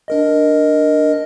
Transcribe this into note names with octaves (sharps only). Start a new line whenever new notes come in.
D4 A#4 D#5